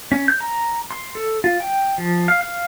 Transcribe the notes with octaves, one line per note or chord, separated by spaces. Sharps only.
C#4
G6
A#5
C6
A4
F4
G5
F3
F5
F5